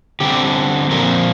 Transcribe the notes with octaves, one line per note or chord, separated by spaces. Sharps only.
D3 G3 C4 G4
A#2 F3 C4 A#4